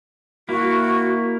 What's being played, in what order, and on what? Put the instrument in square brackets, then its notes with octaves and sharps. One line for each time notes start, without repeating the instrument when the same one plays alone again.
[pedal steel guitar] A#3 E4 [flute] F#4